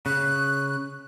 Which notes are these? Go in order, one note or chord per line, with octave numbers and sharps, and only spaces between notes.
C#3 F#6